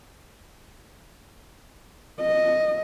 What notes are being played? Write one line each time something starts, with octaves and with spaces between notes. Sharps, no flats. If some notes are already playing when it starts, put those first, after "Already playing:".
D#5